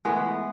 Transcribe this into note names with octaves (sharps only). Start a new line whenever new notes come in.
A2 E3 G#3 B3